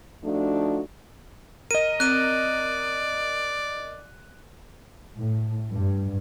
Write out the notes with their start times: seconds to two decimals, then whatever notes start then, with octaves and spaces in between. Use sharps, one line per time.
0.24 F3 A3 D4 D#4 F#4
1.71 A#4 D#5 D#7
2.00 C4 D5 F#6 D#7
5.16 A2
5.71 G2